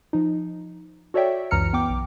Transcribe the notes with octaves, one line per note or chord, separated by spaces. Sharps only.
F3 D#4
F#4 A4 C#5 D5 E5 G5
C#2 F#2 E3 A#5 F6 C#7
B3 G5 D6
B1